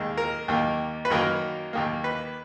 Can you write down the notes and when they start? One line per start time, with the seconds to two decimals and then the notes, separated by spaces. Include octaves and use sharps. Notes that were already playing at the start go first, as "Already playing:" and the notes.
Already playing: D#2 D#3 G#3
0.17 A#4
0.48 D#2 D#3 A#3
1.05 B4
1.10 F#2 D#3 F#3 A#3 A#4
1.73 D#2 D#3 A#3
2.04 B4